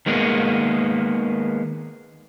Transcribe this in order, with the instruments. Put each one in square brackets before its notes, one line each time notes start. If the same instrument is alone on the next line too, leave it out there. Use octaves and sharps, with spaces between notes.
[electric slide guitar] D#3 G#3 A#3 B3